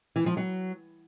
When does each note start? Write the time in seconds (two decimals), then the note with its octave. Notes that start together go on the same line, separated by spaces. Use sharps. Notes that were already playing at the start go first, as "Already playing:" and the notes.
0.16 E3
0.26 F3
0.37 F#3